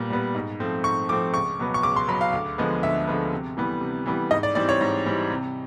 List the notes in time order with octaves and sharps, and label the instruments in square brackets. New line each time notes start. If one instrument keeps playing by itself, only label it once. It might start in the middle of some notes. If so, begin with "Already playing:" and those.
Already playing: [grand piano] A#2 G3 B3
G3 B3
G#2
F3 A3 C4
G#2 C#6
F3 A3 C4 D6
C#2 C#6
B2 F#3 B3
C#6
C#2 D6
C6
B2 F#3 B3 B5
F5
D2
D3 F3 G#3 B3
D2 E5
D3 F3 G#3 B3
C3
E3 G3 B3
C3
E3 G3 B3
G#2 D#5
D5
E3 G3 C4 D5
C#5
G#2
E3 G3 C4
C3